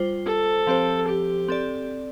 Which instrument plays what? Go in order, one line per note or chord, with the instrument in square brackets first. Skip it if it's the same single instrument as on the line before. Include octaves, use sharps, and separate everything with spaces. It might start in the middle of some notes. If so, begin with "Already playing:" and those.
Already playing: [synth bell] G3 F4 C5
[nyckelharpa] A4
[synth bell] F3 C4 G4 C5
[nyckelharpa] G4
[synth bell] C4 A4 D5